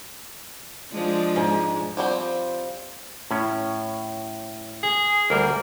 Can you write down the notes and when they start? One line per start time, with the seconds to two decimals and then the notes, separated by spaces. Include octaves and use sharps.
0.92 F3 G#3 D4
1.36 G#2
1.97 F3 G3 C4
3.31 A2 C#4
4.83 G#4
5.30 D2 G3 A#3